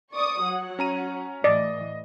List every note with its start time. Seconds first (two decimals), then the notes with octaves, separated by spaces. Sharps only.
0.12 D5 C#6 D#6
0.42 F#3 F#5
0.79 C#4 A#5 D#7
1.44 A2 E3 D5 D#5